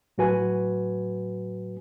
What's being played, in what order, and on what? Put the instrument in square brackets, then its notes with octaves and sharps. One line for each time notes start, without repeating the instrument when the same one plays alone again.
[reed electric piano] A2 F#3 F#4 B4 G#5